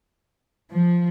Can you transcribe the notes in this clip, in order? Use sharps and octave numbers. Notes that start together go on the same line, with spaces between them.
F3